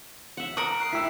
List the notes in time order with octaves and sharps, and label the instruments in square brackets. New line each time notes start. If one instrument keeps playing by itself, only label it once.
[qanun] E5 F#5
[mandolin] A#4 D#6 [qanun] F#5
[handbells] F#6 C7
[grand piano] E4 E6 [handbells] E5 G5 B6